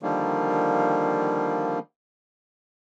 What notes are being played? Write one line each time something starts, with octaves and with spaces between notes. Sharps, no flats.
D3 D#3 F3 G3 A#3